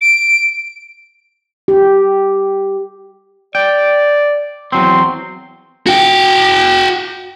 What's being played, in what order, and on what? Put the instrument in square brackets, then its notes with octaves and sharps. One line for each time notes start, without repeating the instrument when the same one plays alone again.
[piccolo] D7
[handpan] G4
[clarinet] D5 [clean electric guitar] G5
[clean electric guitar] E2 F#3 C4 [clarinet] C6
[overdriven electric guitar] F#4 G5